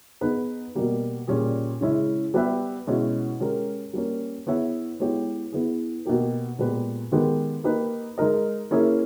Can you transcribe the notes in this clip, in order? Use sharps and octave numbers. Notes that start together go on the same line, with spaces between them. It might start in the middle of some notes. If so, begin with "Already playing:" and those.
B3 D#4 G#4 B4
B2 G3 A#3
A#2 G3 C#4 G#4
C#3 G#3 C#4 E4
G3 B3 G4 B4 E5
B2 G#3 C#4 E4
G#3 C#4 G4 A#4
G3 A#3 C#4
B3 E4 G#4 C#5 E5
G#3 B3 E4 G4 C#5
B3 E4 G#4
B2 A#3 D#4 G4 A#4
A#2 G#3 B3 G4 B4
D#3 G#3 B3 G4 A#4
A#3 D#4 G4 B4
G#3 D#4 A#4 D#5
A#3 C#4 E4 G#4 C#5